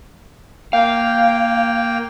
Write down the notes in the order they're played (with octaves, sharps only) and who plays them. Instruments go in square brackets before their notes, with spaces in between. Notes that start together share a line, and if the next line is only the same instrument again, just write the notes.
[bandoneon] A#3 G5 [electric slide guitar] F5